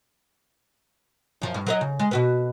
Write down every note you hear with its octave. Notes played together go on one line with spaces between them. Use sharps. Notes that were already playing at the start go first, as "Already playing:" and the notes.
F#2 F3
G2
F#3 B4 D#5
C#3
G#3
B2 F#4 B4